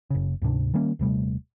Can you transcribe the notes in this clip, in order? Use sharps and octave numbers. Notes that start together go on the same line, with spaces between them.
F#1 C#3
D2 G#2 C3 D4
D#3 G3 A#3 C#4
D#1 C3 G3 A3